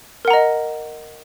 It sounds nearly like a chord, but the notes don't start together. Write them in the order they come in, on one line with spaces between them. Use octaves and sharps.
A#4 F#5 A#5 D#5